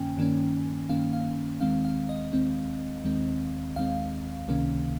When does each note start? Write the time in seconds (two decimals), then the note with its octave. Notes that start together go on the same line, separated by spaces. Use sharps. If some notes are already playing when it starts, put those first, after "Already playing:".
Already playing: G2 D#3 A#3 C#4 G5 G#5
0.17 G2 D#3 A#3 C#4
0.89 G2 D#3 A#3 C#4 F5
1.13 F5
1.60 D#2 D#3 G#3 C4 F5
1.85 F5
2.09 D#5
2.33 D#2 D#3 G#3 C4
3.05 D#2 D#3 G#3 C4
3.76 D#2 D#3 G#3 C4 F5
4.48 C#2 C3 D#3 A#3 C#4